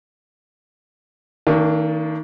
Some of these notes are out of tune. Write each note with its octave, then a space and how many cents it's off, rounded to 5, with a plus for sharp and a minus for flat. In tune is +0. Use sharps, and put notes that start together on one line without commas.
D#3 +25 A#3 -35 D4 -15